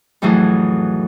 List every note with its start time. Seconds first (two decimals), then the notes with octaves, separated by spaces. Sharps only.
0.22 F2 A2 E3 F#3 E4 G#4